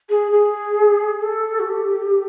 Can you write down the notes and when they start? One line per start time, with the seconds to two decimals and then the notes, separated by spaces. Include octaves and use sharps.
0.09 G#4
0.31 G#4
1.20 A4
1.59 F#4
1.65 G4